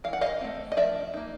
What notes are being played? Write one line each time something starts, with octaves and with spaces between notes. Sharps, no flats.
E3 F5
F#5
D#5 F5
A3 C4
D#5
F3 D5 E5
A#3 D#4